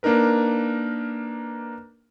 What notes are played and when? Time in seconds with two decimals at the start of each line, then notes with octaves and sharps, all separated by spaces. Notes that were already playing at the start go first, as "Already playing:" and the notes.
0.03 A#3 D4 D#4 A#4 B4